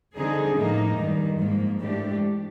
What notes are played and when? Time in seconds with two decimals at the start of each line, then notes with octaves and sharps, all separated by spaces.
0.15 D3 G3 C4 D#4 G#4
0.56 A2 F3 A#3 D#4
0.97 G2 D#3 G3
1.39 G#2 F3 A#3
1.80 G#2 E3 A3 D4 G4